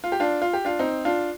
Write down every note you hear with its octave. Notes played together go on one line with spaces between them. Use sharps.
F4
G4
D4 F4
F4
G4
D4 F4
C4 D#4
D4 F4